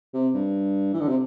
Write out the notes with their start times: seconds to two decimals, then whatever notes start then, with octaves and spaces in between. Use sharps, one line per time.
0.14 C3
0.34 G2
0.94 E3
1.01 D3
1.08 C3